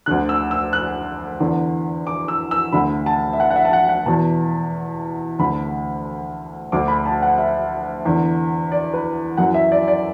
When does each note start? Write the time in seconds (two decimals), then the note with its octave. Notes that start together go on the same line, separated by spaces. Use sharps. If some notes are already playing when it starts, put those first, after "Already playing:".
0.06 D2 D3 F#6
0.29 E6
0.51 E6
0.73 F#6
1.40 E2 D3
2.07 D6
2.28 E6
2.51 E6
2.72 D2 D3 B5
3.06 A5
3.33 E5
3.40 F#5
3.50 F#5
3.56 E5
3.65 A5
3.73 F#5
3.89 F#5
4.06 E2 B2 A5
5.39 D2 D3 B5
6.72 D2 D3 D6
6.88 B5
7.06 A5
7.22 F#5
7.38 E5
8.05 E2 D3
8.72 D5
8.93 B4
9.37 F#2 E3 F#5
9.54 E5
9.72 D5
9.88 D5